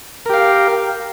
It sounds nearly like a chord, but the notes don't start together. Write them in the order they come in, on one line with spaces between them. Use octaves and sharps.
A#4 G4 F5